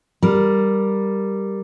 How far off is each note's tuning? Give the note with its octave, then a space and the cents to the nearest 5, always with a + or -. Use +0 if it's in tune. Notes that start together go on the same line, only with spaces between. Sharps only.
G3 +0 A#4 +0